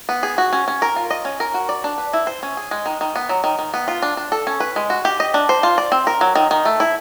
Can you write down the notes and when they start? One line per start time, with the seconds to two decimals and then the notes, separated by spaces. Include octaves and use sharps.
0.09 B3
0.23 G#4
0.38 F#4
0.53 C#4
0.68 C#4
0.82 A#4
0.96 F4
1.10 D#5
1.25 C#4
1.40 A#4
1.54 F#4
1.69 D5
1.84 D4
1.98 B4
2.13 E4
2.27 C5
2.43 C#4
2.57 G#4
2.71 G#3
2.86 D#3
3.01 D#3
3.16 B3
3.29 F#3
3.44 D#3
3.59 D#3
3.74 B3
3.88 F4
4.02 D4
4.17 D4
4.32 A4
4.47 C#4
4.60 B4
4.76 G#3
4.90 F#4
5.05 G4
5.20 D#5
5.34 D4
5.49 C5
5.63 F4
5.78 D5
5.92 C4
6.07 A#4
6.21 F#3
6.35 D#3
6.51 D#3
6.65 A3
6.80 E4